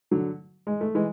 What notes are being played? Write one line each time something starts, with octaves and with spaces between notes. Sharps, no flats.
D3 F#3
G#3
A3
E3 G#3